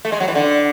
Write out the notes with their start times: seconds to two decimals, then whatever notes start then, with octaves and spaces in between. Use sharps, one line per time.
0.05 A3
0.12 G#3
0.20 F#3
0.28 E3
0.35 D3